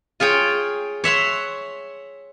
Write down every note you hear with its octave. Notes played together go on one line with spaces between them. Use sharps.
F4 G#4 C#5 G5
C#5 E5 F#5 C6